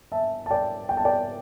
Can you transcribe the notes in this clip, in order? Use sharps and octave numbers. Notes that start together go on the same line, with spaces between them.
E5 A5
A5
D5 G5
G5
A5
D5 G5